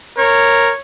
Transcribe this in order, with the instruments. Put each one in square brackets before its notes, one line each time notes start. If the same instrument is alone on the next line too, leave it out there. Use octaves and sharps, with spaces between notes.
[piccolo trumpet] A#4 [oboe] C#5